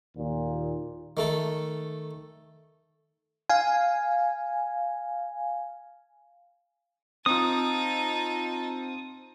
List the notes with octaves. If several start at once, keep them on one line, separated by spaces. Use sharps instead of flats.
D#2 A#2
D#3 A3 A4
F5 G#5
C4 D#4 F4 A5 D#6